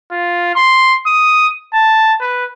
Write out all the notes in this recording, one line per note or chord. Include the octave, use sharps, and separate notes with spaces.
F4
C6
D#6
A5
B4